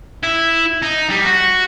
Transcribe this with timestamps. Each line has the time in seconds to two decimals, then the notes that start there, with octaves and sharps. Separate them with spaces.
0.23 E4
0.83 D#4
1.11 G3
1.26 F#4